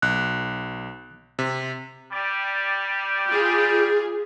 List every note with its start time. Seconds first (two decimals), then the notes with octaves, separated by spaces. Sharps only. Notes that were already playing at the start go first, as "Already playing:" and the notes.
0.02 B1 F#6
1.39 C3
2.12 G3 G4 D5
3.27 F4 G#4